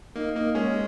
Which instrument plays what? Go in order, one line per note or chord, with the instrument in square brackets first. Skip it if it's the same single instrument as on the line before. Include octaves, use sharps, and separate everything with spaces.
[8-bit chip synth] A#3 [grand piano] D#4
[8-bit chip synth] A#3 [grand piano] D#4
[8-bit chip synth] G#3 [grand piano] C#4